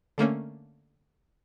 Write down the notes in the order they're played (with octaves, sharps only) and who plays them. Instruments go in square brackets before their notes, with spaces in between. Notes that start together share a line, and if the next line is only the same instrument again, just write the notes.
[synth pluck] D3 A3 A#3 C#4